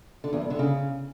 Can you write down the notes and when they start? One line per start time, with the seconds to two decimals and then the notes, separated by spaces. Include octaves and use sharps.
0.24 D3
0.33 E2
0.41 G2
0.50 D3
0.59 C#3